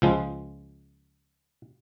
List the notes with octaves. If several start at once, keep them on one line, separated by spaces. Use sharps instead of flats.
C#2 F3 G#3